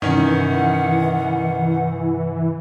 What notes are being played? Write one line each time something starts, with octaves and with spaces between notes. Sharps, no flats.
G2 C3 D#3 E3 C#4 F#5